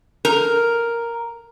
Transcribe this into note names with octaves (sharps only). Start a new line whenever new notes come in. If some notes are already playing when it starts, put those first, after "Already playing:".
A#4